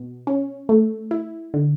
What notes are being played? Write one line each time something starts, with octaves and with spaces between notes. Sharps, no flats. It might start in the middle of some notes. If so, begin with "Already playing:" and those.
Already playing: B2
C#4
A3
E4
D3